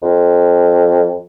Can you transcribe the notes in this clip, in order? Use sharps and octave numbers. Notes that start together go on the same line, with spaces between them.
F2